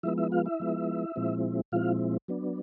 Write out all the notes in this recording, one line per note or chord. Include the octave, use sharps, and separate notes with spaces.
F3 G#3 B3 E4 E5
E4 E5
F4 F5
E4 E5
F3 G#3 B3
A#2 F3 G#3 C4 E4
A#2 F3 G#3 C4 E4 F4 F5
F#3 B3 D4